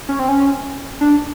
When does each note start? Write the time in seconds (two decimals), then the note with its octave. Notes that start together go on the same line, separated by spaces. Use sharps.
0.09 C#4
0.19 C4
0.29 C#4
1.01 D4